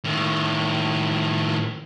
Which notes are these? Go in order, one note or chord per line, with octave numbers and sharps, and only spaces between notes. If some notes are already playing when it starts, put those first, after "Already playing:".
A2 D#3